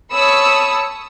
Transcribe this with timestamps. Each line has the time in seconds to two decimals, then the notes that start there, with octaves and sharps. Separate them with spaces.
0.11 C#5 A5 B5 D#6 E6 C#7